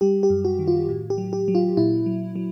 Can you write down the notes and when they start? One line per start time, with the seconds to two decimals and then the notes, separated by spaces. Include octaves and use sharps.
0.01 G3 G4
0.23 G4
0.30 F#2
0.45 F#4
0.59 D#3
0.68 F4
0.89 A2
1.10 G4
1.18 F#3
1.33 G4
1.48 F#3
1.55 F4
1.77 A#2 E4
2.06 F#3
2.36 F#3